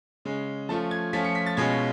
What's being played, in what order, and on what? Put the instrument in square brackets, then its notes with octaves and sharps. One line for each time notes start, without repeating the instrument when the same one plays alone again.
[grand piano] C#3 G#3 C#4
F3 A3 C#4 F4 A5
G#6
F3 A3 C#4 F4 B6
C#7
B6
A6
B2 G#3 C#4 F4 G#6